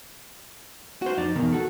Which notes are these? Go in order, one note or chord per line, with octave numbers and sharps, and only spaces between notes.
F#4 C5
F2 D#4 D5
E2 B2 D#3
F#4 A4